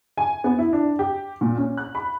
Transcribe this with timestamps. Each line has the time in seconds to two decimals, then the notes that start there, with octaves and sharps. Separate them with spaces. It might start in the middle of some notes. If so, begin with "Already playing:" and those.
0.18 G#5
0.44 B3
0.58 E4
0.73 D4
0.99 G4
1.41 A#2
1.58 C#4
1.77 F#6
1.95 B5